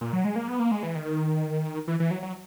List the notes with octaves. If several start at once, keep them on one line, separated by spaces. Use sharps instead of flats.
A#2
F#3
G#3
A#3
B3
A#3
G#3
E3
D#3
E3
E3
F#3
F#3